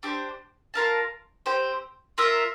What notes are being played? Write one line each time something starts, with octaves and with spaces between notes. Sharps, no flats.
D4 G4 C5
F4 A#4 F5 A5
C4 G4 C5
F4 A#4 E5